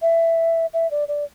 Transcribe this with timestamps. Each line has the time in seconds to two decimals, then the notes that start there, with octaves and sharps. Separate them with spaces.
0.02 E5
0.73 E5
0.91 D5
1.08 D5